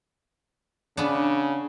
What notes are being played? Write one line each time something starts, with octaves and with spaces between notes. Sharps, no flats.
C#3 B3 D4